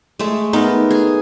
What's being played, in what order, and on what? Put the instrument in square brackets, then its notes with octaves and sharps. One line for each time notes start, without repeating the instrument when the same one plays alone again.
[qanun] G#3 A3
[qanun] B3 [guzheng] D#4 A#4
[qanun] G#4